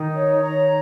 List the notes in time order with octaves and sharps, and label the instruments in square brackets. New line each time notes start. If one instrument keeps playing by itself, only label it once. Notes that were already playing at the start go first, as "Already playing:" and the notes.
Already playing: [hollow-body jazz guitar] D#3 [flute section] D#4
[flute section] C#5
A#5